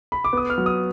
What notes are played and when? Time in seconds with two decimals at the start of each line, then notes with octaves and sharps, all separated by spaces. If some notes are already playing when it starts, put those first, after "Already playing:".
0.12 B5
0.25 D6
0.33 B3 D#6
0.50 F6
0.58 F#3
0.66 D#6